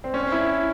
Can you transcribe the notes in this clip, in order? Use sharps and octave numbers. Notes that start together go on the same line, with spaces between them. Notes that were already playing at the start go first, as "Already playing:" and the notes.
C4
C#4
E4